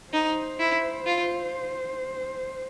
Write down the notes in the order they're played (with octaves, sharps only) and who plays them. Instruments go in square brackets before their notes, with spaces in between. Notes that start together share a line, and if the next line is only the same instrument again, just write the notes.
[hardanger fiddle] D#4 [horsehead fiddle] C5
[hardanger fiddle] E4
F4